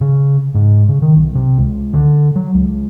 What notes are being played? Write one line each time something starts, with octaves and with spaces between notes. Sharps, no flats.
C#3
G#2
C#3
D#3
B1
C3
C#2
D3
F#3
C#2